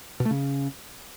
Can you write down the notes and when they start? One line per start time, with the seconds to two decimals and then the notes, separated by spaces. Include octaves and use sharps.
0.20 B2
0.25 A3
0.31 C#3